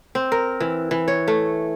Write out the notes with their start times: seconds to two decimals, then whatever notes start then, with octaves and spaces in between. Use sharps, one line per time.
0.15 C4
0.32 A#4
0.60 E3
0.91 E3
1.08 C#5
1.28 A3